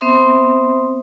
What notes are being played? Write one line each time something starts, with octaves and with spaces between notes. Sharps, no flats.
B3 C4 C5 E5 C6 D#6